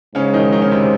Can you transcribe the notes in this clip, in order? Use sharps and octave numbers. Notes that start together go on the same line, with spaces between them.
G#2 C#3 C#4
D#3 D#4
D#3 D#4
C#3 C#4
C3 C4